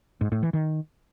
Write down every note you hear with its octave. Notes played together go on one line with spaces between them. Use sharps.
G#2
A2
E3
D#3